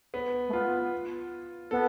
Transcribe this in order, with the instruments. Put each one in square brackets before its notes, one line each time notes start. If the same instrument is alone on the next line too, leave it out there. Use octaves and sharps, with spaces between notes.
[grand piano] B3
[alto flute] A3
[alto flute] B3 [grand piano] F4
[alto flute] B3 [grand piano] A4